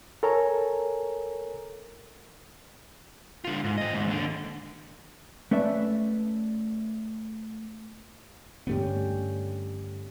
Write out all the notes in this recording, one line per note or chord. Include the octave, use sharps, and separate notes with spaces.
A4 A#4 C#5 G#5 A#5
D3 F4
G#2
C4 D#5
D2 G#2
D#2 D3
A3 C#4 B4 D5 E5
G2 D3 A3 B3 C#4 G4